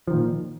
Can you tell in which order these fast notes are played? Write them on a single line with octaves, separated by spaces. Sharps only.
F3 D#3 A#2